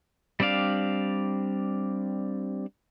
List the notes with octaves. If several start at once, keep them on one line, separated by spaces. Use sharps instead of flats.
G3 C4 D4 D5 F5